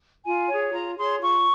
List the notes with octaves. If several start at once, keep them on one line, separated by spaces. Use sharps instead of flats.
F4 G#5
G#4 C#5
F4 A#5
G#4 C#5 C6
F4 C#6